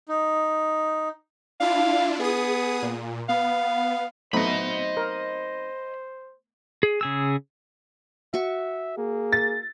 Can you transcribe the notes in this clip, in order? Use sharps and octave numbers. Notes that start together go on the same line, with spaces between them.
D#4
D4 E4 F4 F5
B3 G#4 D#6
A#2
B3 F5
F#3 A3 B3 C4 D#4 C5 D#5 B5
A#4
G#4
C#3 G#4 E6
F#4 E5 C#6
A#3 G#4
A6